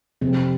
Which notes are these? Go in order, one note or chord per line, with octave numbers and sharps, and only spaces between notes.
F2 C3 C4